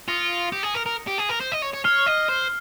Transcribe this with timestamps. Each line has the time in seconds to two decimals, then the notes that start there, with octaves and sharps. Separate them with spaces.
0.08 F4 D#6 A#6 C#7
0.52 G4
0.63 G#4
0.75 A#4
0.86 A#4
1.07 G4
1.18 G#4
1.29 A#4
1.40 C5
1.52 D#5
1.62 C#5
1.73 C#5
1.84 C#5 F6 C7 G7
2.07 D#5
2.29 C5